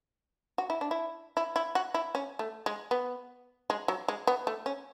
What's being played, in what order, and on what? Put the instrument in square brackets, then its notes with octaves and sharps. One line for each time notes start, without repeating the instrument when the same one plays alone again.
[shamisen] F#4
E4
D4
E4
E4
E4
F#4
E4
C#4
A3
G#3
B3
G#3
F#3
G#3
B3
A3
C#4